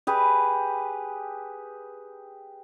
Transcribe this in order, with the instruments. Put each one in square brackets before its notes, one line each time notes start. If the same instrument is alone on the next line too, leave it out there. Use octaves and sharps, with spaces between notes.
[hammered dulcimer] G4 G#4 B4